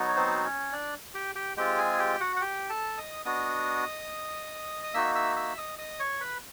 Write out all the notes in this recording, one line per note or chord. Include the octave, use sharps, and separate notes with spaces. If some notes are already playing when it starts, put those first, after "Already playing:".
Already playing: F#3 B3 D#4 F#4
C#5
C4 C5
C#4 C#5
D4 D5
G4 G5
G4 G5
G#3 C4 F4 G4 G5
G#4 G#5
G4 G5
F#4 F#5
F#5
G4 G5
A4 A5
D#5 D#6
B3 D4 F#4 D#5 D#6
D#6
A#3 D#4 F#4 E5 E6
E5 E6
E5 E6
D#5 D#6
D#5 D#6
C#5 C#6
B4 B5